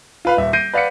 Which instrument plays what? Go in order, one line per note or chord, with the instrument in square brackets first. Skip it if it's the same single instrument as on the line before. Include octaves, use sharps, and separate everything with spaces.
[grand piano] F4 B4 F5
D#1 E5
G6 A#6 C7 D7 D#7
B4 D5 F5 F#5 B6 C#7